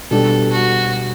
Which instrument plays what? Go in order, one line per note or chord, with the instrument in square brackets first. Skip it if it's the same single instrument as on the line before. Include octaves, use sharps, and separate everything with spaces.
[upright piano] B2 G3 D4 G4 [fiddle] A4
[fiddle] F#4